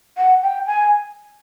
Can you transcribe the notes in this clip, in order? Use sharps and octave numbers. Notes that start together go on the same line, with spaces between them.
F#5
G5
G#5